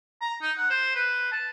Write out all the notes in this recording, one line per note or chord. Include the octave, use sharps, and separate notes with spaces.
A#5
D#4
F#5
C5
B4
A5